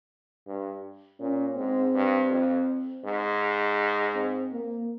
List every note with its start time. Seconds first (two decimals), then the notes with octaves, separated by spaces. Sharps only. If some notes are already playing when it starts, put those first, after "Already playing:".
0.47 G2
1.20 A#2 C#4
1.56 G#2 C4
1.94 G2
2.31 F2
3.04 G#2
4.15 C4
4.53 A#3